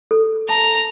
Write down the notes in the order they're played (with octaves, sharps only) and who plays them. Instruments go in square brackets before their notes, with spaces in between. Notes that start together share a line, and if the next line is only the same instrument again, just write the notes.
[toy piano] A4
[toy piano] A5 [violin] A#5